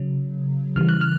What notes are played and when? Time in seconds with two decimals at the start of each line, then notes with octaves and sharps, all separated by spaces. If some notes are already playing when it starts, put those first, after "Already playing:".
Already playing: C#3 F#3
0.76 C#3 E3 G3 F6
0.89 F#6
1.01 F6